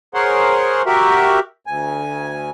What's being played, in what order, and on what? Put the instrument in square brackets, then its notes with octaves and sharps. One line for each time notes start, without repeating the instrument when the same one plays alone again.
[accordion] G#4 A#4 C5 C#5 F#5 C6
F#4 G4 A#4 E5
D2 G#5